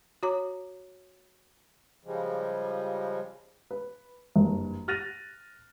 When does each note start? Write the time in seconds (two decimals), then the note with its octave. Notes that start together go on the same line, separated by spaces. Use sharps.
0.23 F#4 C#5 A#5 D6
2.05 C#3 F3 G3 G#3
3.71 B4
4.36 F#1 G2
4.88 F6 F#6 A6 A#6 D#7 F7